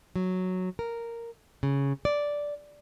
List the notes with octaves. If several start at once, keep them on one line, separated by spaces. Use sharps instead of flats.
F#3
A#4
C#3
D5